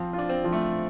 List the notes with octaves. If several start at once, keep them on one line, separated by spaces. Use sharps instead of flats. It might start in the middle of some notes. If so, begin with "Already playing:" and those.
Already playing: F3 C4
F4
D4
C4
F3
A3